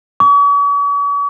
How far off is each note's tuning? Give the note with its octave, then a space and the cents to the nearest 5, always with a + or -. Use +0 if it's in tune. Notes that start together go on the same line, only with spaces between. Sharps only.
C#6 +45